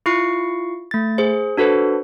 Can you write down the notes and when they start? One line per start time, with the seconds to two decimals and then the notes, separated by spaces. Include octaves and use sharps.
0.06 E4 F4 C#6 C7 C#7
0.91 A3 A6
1.18 G#4 C5
1.57 D4 F#4 A4 B4 C5